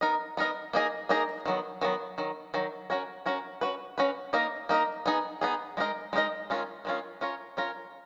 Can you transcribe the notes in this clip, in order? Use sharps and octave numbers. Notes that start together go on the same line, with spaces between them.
B3 D#4 A#4 D#5
B3 D#4 A#4 D#5
A#3 D#4 G#4 D#5
A#3 D#4 G#4 D#5
D#3 F#3 B3
D#3 F#3 B3
D#3 F#3
D#3 F#3
C#4 F#4 A#4 C#5
C#4 F#4 A#4 C#5
C#4 F#4 B4
C#4 F#4 B4
A#3 D#4 A#4 D#5
A#3 D#4 A#4 D#5
B3 D#4 G#4
B3 D#4 G#4
G#3 B3 D#4 A#4 D#5
G#3 B3 D#4 A#4 D#5
D#3 G#3 C#4 F4
D#3 G#3 C#4 F4
C#4 F4 A#4 C#5
C#4 F4 A#4 C#5